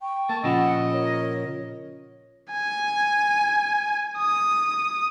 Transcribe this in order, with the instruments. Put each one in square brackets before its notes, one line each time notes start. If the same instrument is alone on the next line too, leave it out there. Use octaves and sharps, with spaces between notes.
[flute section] G5 C#6
[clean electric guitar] A#3 [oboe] A5
[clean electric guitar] A#2 C#3 F3 [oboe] D#5 [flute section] F#5 B5 E6
[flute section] A#4 C#5
[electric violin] G#5
D#6